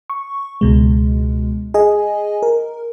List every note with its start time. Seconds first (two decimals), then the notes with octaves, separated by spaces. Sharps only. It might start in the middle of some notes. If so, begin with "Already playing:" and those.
0.10 C#6
0.61 C#2 B2 G#3
1.74 G#4 D#5 G#5
2.43 A#4